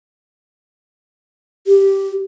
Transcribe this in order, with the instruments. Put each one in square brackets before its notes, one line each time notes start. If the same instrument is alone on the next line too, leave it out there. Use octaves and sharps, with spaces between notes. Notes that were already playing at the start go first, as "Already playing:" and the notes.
[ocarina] G4